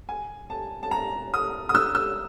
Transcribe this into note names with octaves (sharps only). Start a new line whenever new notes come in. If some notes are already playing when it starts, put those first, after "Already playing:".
G#5
A5
A5
A#5
D#6
D#6
E6
E6